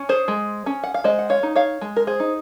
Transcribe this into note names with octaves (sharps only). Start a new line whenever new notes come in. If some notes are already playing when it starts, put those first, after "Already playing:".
Already playing: C#4
G#4 C5
G#3
C#4
F#5
F5
G#3 C5 D#5
F#5
C#5 F5
D#4
C#5 F5
G#3
A#4
G#4 C5
D#4